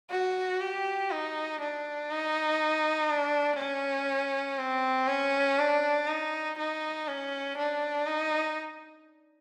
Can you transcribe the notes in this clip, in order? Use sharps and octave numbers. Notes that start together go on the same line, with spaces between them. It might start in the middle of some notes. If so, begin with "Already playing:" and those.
F#4
G4
D#4
D4
D#4
D4
C#4
C4
C#4
D4
D#4
D#4
C#4
D4
D#4